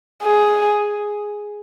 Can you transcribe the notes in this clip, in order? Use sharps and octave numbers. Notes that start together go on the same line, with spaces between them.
G#4